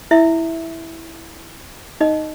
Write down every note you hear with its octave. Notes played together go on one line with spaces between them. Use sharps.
E4 E5
D#4 D#5